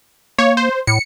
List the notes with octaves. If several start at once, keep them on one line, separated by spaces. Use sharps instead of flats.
A#3 C#5
C5
A2 C#7